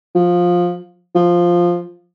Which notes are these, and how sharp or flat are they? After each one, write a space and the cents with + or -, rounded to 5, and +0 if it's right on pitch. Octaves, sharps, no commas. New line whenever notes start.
F3 +15
F3 +0